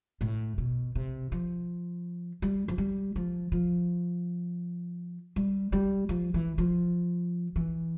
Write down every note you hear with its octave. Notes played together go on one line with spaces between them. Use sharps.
A2
B2
C3
F3
G3
F3
G3
F3
F3
G3
G3
F3
E3
F3
E3